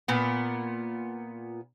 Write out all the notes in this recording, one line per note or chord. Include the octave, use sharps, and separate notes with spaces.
A#2 B3